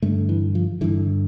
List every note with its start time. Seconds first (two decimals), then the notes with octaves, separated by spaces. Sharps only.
0.02 G2 D3 A3
0.29 E3
0.55 F3
0.81 G2 D3 E3